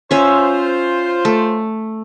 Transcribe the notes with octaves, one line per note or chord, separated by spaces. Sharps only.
C#4 F4 C5 E5
A3